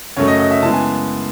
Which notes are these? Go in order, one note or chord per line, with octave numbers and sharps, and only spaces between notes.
F#2 C#3 F#3 A3 C#5
D#5
D#5
E5
C#3 E3 G#3 B3 A5
G#5